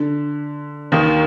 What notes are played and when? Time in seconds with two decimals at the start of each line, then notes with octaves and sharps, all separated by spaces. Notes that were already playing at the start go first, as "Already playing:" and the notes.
Already playing: D3
0.92 D#2 D#3